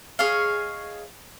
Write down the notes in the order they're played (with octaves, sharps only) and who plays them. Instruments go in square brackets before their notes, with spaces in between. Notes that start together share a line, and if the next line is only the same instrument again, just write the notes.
[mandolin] G#4 C#5 D#5 F5